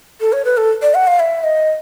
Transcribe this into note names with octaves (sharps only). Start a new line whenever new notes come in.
A4
C#5
B4
A4
D5
F#5
F5
E5
D#5